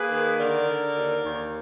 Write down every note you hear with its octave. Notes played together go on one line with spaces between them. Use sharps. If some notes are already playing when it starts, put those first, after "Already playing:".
Already playing: A#3 G#4 B4
D#3
D3 A#4 D5
D3
D#2
D#2